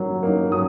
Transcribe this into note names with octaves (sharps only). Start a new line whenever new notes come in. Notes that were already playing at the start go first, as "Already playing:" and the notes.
Already playing: F#3 A#3 D#4
A#3 D#4
F#3 D#6